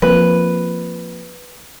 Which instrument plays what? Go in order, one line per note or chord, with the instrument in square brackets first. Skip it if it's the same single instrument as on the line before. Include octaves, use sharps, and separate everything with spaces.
[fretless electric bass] F3 A#3 C4 [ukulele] B4